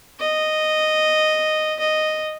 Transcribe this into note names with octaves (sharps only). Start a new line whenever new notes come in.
D#5
D#5